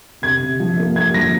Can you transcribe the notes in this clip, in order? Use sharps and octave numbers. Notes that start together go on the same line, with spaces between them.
C3 G#6
C3
F3
A#3
A#3 G#6
F3 A#6